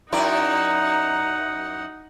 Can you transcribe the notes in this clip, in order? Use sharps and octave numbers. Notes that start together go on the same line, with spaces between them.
F#2 D#4 E4 D5 F#5 A#5